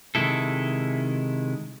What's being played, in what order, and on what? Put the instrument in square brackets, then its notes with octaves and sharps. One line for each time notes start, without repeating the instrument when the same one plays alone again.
[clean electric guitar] C3 D#3 G#3 E4 A4